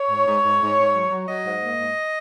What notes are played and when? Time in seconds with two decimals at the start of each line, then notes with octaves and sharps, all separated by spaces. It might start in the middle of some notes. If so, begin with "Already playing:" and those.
Already playing: C#5
0.10 G#2
0.26 G#2
0.43 G#2
0.60 G#2
0.77 G#2
0.94 F#3
1.11 F#3
1.27 F#3 D#5
1.45 G#2
1.62 A#3
1.79 G#2